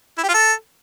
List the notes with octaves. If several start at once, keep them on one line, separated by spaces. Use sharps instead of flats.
E4
G4
F4
A4